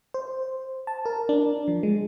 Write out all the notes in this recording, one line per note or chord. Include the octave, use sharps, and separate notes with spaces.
C5
A5
A#4
D4
F3
G#3